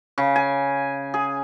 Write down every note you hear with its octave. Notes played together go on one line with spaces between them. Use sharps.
C#3
G#5
G#4